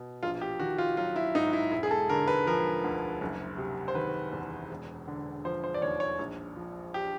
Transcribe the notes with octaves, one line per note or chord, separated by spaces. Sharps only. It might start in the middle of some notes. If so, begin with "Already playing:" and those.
Already playing: B2
A#1 F4
G4
D#3 F#4
F4
F#3 F4
E4
G#2 D#4
E4
E1 E4
G#4
A4
D3 A#4
B4
F3 A#4
D2
F#1
C3
C5
D#3 B4
E2
E1
D3
F3 C5
C5
D5
D#2 C#5
C#5
A#1
F3
G4